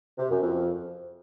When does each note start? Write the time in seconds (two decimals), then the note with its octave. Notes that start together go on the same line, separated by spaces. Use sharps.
0.19 C3
0.30 F#2
0.41 F2